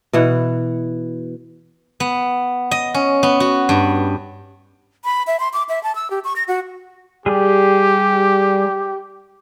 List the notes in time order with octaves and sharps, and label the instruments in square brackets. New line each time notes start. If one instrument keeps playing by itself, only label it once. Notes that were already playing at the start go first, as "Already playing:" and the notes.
[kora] B2 E3 F#5
[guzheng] B3
D#5
C#4
B3
F#4
G2
[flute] B5
E5
C6
D6
E5
A5
E6
G4
C#6
A#6
F#4
[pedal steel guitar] G3 G#4 [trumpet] G4